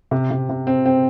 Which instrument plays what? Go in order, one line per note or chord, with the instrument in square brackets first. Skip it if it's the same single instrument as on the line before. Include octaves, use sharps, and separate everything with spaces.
[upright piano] C3
C3
C3
C4
C4